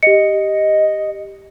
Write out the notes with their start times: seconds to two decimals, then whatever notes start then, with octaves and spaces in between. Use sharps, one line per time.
0.03 G4 D#5 C#7